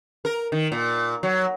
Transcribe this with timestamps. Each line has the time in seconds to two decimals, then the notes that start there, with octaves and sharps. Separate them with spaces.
0.25 A#4
0.52 D#3
0.72 A#2
1.23 F#3